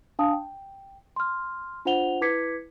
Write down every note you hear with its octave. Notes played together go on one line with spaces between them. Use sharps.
D4 F5 A5 D#6
G5
C6 F6
D4 F4 C5 F#5 F7 G7
E4 B4 D6 G#6 B6 C#7